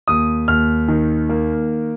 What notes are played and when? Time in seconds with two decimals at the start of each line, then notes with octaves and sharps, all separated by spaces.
0.08 D#2 D#6
0.48 D#2 F6
0.88 D#3
1.29 A#3